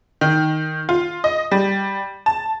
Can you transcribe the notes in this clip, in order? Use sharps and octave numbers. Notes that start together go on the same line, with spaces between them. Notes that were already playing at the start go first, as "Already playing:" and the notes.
D#3
F4
D#5
G3
A5